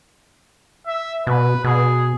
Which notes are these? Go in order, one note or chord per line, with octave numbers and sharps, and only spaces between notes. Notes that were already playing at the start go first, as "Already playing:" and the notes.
E5
B2 B4
B2 G#4